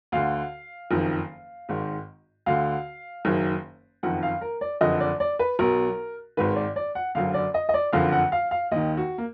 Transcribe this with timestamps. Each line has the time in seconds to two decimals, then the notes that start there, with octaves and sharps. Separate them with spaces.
0.12 D2 D3 F5
0.91 F#1 F2 D#3
1.69 G#1 G#2 D#3
2.46 D2 D3 F5
3.25 F#1 F#2 D#3
4.03 F#1 F2 D#3 F#5
4.23 F5
4.41 A#4
4.61 D5
4.81 F#1 F2 D3 D#5
5.00 D5
5.20 D5
5.39 B4
5.59 B1 B2 A#4
6.37 G#1 G#2 D#3 B4
6.56 D5
6.76 D5
6.95 F#5
7.15 F#1 F#2 D3 F5
7.34 D5
7.54 D#5
7.69 D#5
7.74 D5
7.93 F#1 F2 D3 F5
8.12 F#5
8.32 F5
8.51 F5
8.71 D#2 D#3 D#5
8.97 F#4
9.18 A#3